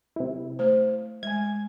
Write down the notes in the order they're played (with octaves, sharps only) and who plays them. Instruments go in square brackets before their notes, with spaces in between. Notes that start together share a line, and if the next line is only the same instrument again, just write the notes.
[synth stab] C3 E4
[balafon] A3 C5
[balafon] G#3 [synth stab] G#5 G#6